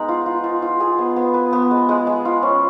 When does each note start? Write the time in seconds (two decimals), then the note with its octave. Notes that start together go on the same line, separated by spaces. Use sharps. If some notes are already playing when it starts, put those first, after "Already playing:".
Already playing: G#3 B3 D#4
0.09 F4
0.26 F4
0.44 F4
0.62 F4
0.80 G#4
0.99 B3
1.16 B3
1.34 B4
1.53 B3
1.71 G#3
1.89 G#3
2.07 G#3
2.25 F4
2.43 C#4